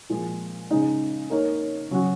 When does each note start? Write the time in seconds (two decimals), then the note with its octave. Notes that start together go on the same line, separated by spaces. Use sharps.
0.09 A#2 F3 G#3
0.71 C#3 G#3 D#4
1.30 A#3 D#4 A#4 C#5
1.90 C#3 F#3 C#4 F#4